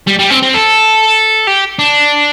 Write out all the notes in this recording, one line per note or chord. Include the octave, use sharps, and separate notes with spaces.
G3
G3
C4
C4
A4
G4
D4